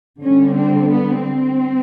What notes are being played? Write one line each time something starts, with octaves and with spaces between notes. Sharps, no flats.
D3 G3 C#4
C4
B3
C4